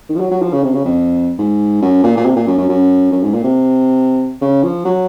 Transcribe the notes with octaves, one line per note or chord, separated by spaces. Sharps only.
D#3
F3
F#3
F#3
F3
C#3
C3
C#3
F2
G#2
F#2
A#2
A#2
C3
A#2
F#2
F#2
F#2
F#2
G#2
A#2
C3
C#3
F3
F#3